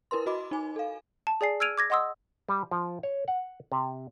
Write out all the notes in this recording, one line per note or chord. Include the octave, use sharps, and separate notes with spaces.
E4 A#4 B4 C6
F#4 D#5 B5 D6
D#4 G#5
A4 F5
A5
G#4 D5 G#5 C7
E6 F6 G#6 D7 D#7 F7
D6 G#6 A#6
D#5 F#5 C6 D#6 E6
G3
F3
C#5
F#5
C3